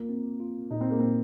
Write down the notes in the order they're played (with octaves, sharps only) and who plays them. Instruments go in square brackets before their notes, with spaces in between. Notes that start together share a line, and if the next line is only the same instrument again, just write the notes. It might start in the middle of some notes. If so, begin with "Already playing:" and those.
Already playing: [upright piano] A#3 [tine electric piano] F4
[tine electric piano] C4
F4
[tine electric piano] A#2 [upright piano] D#4
[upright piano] C4
A#3
[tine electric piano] A#2 [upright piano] C4